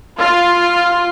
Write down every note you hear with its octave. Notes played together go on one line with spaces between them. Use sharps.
F4